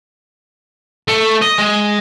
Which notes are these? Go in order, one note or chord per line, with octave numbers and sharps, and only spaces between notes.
A3
D#5
G#3